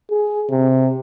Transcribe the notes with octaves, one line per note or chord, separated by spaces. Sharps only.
G#4
C3